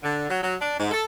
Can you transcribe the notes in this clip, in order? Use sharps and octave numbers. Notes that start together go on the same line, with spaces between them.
D3
F#3
F#3
D4
G#2
A4